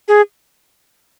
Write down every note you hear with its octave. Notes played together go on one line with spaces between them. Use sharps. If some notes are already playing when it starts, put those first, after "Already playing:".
G#4